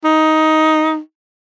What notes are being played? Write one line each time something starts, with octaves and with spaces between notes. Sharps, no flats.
D#4